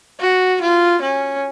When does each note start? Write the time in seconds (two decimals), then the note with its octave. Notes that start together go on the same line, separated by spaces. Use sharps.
0.20 F#4
0.62 F4
1.02 C#4